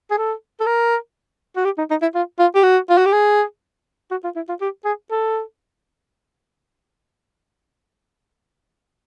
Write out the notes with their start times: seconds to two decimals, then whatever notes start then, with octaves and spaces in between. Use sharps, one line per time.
0.11 G#4
0.18 A4
0.60 A4
0.66 A#4
1.56 F#4
1.65 G4
1.78 D#4
1.90 D#4
2.02 E4
2.15 F4
2.39 F4
2.55 G4
2.63 F#4
2.90 F4
2.98 F#4
3.06 G4
3.12 G#4
4.11 F#4
4.24 F4
4.36 E4
4.49 F4
4.61 G4
4.85 G#4
5.11 A4